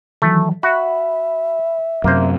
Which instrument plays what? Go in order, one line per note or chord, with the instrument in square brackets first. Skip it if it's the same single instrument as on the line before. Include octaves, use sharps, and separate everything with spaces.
[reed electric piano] D#3 E3 F#3 [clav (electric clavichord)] A3
[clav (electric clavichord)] F#4 [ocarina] E5 [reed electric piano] B5
[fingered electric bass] F#2 C3 [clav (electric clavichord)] A#3 C5